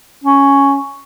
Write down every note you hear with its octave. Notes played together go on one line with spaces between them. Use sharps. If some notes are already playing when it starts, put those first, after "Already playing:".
C#4